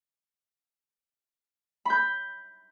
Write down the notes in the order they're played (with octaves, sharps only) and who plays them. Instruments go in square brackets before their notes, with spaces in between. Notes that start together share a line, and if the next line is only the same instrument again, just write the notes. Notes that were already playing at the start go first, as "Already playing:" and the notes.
[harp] B5 G6